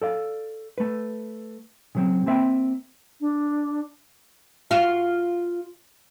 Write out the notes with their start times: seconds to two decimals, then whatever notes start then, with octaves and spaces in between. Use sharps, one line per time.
0.02 A4 D5 F5
0.78 A3 B4
1.95 C#3 F#3 C4
2.26 A#3 C4 E5 F5 G5 B5
3.21 D4
4.71 F4 F#4 F5